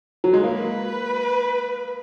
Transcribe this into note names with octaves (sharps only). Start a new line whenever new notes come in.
F#3
G#3
A#3 B4